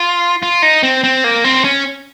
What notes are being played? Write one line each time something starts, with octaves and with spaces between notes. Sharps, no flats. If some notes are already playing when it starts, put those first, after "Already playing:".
Already playing: F4
F4
D#4
C4
C4
A#3
C4
C#4